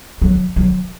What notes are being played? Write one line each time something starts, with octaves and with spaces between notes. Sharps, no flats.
F#3
F#3